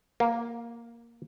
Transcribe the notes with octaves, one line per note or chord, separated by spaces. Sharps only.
A#3